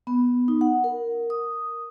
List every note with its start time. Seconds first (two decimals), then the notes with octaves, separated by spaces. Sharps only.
0.07 B3
0.48 D#4
0.61 F#5
0.84 A#4
1.30 D#6